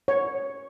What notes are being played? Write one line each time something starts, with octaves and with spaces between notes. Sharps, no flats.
C#5